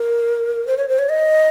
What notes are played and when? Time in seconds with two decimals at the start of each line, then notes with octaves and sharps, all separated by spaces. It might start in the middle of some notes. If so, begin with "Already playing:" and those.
Already playing: A#4
0.67 C5
0.77 C#5
0.88 C5
0.98 C#5
1.09 D#5